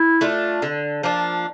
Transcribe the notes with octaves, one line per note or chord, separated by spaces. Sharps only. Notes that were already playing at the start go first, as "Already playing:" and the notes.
Already playing: E4
A3 D4 F4
D3
F3 A#3 D4